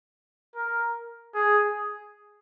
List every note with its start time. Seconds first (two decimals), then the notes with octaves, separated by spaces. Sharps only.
0.55 A#4
1.34 G#4